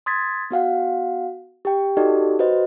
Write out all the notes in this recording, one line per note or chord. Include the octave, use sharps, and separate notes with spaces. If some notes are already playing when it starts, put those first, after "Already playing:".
C6 D#6 G#6 A6 B6
B3 F#4 F5 F#5
G4 G5
D#4 F#4 G4 A4 D5 D#5
F#4 B4 C5 D#5